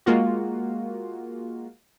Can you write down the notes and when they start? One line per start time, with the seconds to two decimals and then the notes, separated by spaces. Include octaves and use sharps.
0.06 G#3 A#3 F4 F#4